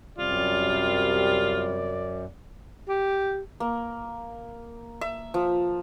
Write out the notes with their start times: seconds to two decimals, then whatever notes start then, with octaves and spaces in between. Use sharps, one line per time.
0.19 F#2 C3 G3 F4 D5
2.89 G4
3.60 A#3
5.01 E5
5.34 F3